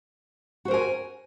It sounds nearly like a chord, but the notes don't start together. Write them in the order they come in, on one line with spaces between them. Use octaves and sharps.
F#4 C5 A#4 G#5